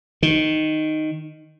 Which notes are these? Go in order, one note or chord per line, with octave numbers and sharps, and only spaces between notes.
D#3